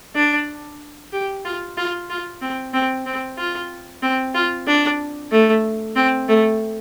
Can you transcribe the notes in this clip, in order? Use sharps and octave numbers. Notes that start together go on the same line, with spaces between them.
D4
G4
F4
F4
F4
C4
C4
C4
F4
C4
F4
D4
A3
C4
A3